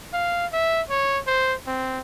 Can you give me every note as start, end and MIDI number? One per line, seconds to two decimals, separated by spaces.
0.13 0.47 77
0.53 0.82 76
0.90 1.19 73
1.27 1.54 72
1.67 2.01 60